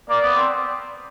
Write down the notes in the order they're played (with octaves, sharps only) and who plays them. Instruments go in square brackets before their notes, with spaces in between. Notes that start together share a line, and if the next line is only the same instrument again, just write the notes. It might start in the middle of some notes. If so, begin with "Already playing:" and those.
[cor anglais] A#3 [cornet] D5
[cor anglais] B3
C4